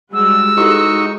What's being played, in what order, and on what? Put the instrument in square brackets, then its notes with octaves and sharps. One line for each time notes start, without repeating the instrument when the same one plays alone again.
[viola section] G3 G#3 F#4 [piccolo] E6
[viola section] G#3 F#4 [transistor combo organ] D#4 C#6 [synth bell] E4 G4 A4